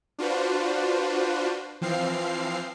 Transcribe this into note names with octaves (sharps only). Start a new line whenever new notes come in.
D4 F4 F#4 B4 C5
E3 F3 C4 F5 C7